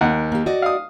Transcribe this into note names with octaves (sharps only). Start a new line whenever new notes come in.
D#2 A#4 F#5
A#3 G4
F#4 D5 D#5
F5 D#6